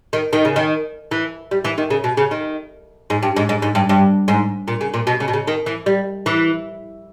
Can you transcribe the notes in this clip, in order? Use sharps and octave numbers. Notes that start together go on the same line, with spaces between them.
D#3
D#3
C#3
D#3
E3
G3
E3
D#3
C#3
B2
C#3
D#3
G#2
G2
G#2
G#2
G#2
G2
G2
G#2
A#2
C#3
A#2
B2
C#3
B2
C#3
D#3
E3
G3
E3